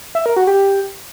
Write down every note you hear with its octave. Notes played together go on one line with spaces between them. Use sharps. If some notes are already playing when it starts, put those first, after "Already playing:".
E5
A#4
F#4
G4